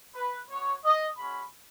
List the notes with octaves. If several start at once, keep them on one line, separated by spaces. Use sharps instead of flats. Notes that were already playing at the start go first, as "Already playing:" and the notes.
B4
B3 F#4 C#5
D#5
G#3 C#4 F#4 B5